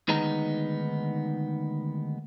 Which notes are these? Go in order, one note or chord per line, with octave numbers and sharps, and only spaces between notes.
D2 D#3 G#3 B3 D#4 A#5